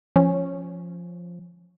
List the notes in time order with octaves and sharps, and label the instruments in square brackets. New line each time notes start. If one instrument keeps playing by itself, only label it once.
[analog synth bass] F3 [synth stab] C#4